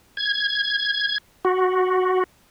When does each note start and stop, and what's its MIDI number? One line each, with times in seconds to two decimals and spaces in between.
0.17 1.18 92
1.45 2.24 66